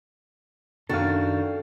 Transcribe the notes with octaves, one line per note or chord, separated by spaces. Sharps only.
F#2 D#3 D4 F#4 A4 F5